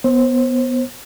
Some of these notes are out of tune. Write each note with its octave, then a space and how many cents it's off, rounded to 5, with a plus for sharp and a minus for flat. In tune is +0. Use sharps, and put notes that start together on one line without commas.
B3 +0 C5 +30